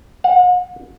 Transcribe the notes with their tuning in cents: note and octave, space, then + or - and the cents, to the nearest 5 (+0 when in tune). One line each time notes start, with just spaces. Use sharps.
F#5 -40